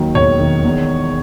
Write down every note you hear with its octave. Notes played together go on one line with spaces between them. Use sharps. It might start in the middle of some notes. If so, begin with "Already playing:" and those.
Already playing: D#2 D#3 F#3
E1 C#5
D#3
E2